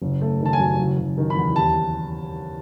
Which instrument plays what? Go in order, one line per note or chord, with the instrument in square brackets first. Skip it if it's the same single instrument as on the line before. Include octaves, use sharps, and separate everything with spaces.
[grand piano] F#1
A3
D#3
A5
G#5
F#2
F#1
F#1
D#3
B5
E2
D#2 A5